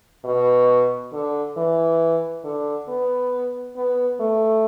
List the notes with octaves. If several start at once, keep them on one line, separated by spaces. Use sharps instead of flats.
B2
D3
E3
D3
B3
B3
A3